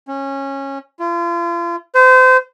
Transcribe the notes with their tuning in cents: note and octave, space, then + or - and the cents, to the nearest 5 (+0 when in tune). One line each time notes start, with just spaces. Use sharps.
C#4 -20
F4 -40
C5 -30